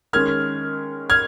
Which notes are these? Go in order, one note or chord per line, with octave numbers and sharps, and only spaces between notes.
D#3 G#3 C#4 F6 G#6
F6 G#6